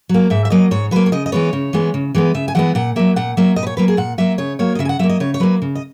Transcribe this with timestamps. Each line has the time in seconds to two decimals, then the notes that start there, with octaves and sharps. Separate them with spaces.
0.09 F#3 A#3
0.30 G#2 E5
0.45 E5
0.50 F#3 A#3 D#5
0.71 G#2 C#5
0.91 F#3 A#3 B4
1.06 C#5
1.12 C#3 D#5
1.26 D#5
1.32 E3 G#3 B3 C#5
1.53 C#3
1.73 E3 G#3 B3
1.94 C#3
2.15 E3 G#3 B3
2.34 C#3 E5
2.48 G#5
2.55 E3 G#3 B3 F#5
2.75 A#2 F#5
2.96 F#3 A#3 E5
3.16 A#2 F#5
3.37 F#3 A#3 E5
3.56 A#2 D#5
3.63 B4
3.67 C#5
3.77 F#3 A#3 B4
3.88 G#4
3.97 A#2 F#5
4.18 F#3 A#3 E5
4.38 C#3 C#5
4.59 F#3 A#3 C#5
4.75 D#5
4.79 C#3 E5
4.85 G#5
4.89 F#5
4.99 F#3 E5
5.03 A#3
5.09 D#5
5.20 C#3 C#5
5.34 C#5
5.40 F#3 A#3 B4
5.62 C#3
5.75 D#5